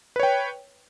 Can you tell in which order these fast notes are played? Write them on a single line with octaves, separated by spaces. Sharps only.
B4 C#5 G5